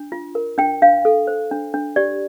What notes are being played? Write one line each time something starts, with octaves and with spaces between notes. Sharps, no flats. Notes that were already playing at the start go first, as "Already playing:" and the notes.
Already playing: D4
F4
A#4
D4 G5
D4 F5
A4
C5
D4
D4
G4 D5